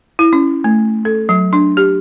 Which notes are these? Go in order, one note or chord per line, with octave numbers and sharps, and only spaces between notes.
E4
C#4
A3
A4
F#3
D4
G4